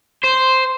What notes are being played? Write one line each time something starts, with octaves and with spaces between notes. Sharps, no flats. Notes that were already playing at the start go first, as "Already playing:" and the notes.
C5